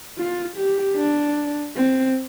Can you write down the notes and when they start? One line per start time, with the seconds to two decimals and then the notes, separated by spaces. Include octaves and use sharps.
0.18 F4
0.57 G4
0.97 D4
1.76 C4